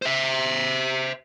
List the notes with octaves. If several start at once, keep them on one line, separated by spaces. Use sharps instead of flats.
C5 E5